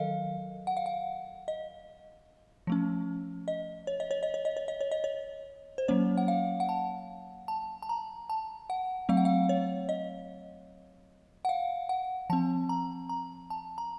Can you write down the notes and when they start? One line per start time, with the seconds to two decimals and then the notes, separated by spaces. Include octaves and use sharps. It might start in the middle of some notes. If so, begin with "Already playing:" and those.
Already playing: D#3 F#3 A4 A#4 D#5 F5
0.67 F#5
0.77 F5
0.86 F#5
1.48 D#5
2.67 F3 A3 C#4
3.48 D#5
3.87 C#5
4.00 D#5
4.11 C#5
4.23 D#5
4.34 C#5
4.45 D#5
4.57 C#5
4.68 D#5
4.81 C#5
4.91 D#5
5.04 C#5
5.78 C5
5.88 F#3 A#3 C#4 C#5
6.17 F#5
6.28 F5
6.60 F#5
6.69 A5
7.48 A5
7.82 A5
7.89 A#5
8.30 A5
8.70 F#5
9.09 F#3 A3 C4 F5
9.17 F#5
9.25 F5
9.49 C#5
9.89 D#5
11.45 F#5
11.49 F5
11.89 F#5
12.30 F3 C4 A5
12.69 A#5
13.09 A#5
13.50 A5
13.78 A#5